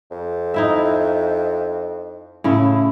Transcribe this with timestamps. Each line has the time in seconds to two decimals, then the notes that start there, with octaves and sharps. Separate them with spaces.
0.11 F2
0.54 D#4 E4 E5
2.44 A2 C#3 E4